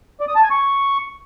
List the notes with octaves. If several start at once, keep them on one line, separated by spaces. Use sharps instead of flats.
D5
D#6
A5
G#5
C#6